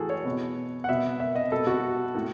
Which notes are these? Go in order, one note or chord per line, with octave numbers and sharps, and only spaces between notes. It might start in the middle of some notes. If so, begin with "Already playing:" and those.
Already playing: A2 E3 F#4 G#4 A4
C#5
B2
F#5
B2 E5
E5
D#5
B2 A4
F#4
A2